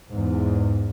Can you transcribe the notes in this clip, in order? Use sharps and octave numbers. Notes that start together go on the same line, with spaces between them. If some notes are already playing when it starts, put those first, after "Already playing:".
E2 G#2